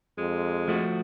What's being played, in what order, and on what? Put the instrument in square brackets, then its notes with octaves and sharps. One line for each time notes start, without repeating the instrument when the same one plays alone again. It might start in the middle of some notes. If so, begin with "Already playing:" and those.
[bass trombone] F2 [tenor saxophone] G#3
[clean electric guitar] F3 A3 F#4